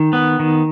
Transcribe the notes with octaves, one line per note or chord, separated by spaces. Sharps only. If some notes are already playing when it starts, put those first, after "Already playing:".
Already playing: D#3
B3
D#3